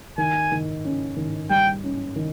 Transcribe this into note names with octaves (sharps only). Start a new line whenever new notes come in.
D#3 G#5
D#3
C#4
D#3
G3 G5
C#4
D#3